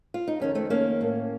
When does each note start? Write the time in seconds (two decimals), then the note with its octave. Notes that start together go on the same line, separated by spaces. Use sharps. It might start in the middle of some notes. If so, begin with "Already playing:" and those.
0.14 F4
0.28 D#4
0.40 F2 D#3 C#4
0.55 A3 C4
0.70 A#3 C#4
1.01 A2